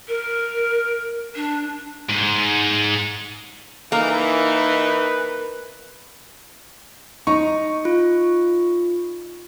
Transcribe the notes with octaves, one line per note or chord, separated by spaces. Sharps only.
A#4
D4
G#2
E3 A#3 D#4 A#4 B4
D#4 C#6
F4